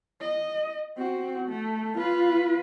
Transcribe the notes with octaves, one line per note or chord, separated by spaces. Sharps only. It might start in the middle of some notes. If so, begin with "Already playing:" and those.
D#5
C4 F#4
A3
F4 B4